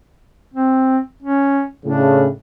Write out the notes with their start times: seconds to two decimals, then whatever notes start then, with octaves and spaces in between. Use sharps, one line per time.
0.53 C4
1.22 C#4
1.85 A2 C#3 D4